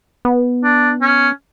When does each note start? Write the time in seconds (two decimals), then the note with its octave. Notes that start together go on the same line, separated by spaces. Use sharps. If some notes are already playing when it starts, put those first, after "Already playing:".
0.25 B3
0.64 D4
1.02 C#4